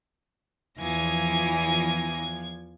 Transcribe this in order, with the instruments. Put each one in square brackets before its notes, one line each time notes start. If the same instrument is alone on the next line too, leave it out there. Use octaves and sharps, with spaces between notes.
[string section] E2 F3 G#6 [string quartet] E3 G#5 A#6